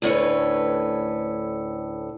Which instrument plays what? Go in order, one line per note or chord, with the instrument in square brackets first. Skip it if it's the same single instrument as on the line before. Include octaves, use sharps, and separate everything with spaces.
[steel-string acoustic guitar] D2 A2 C#4 B4